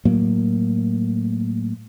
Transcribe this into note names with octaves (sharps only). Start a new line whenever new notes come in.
A2 F#3 A#3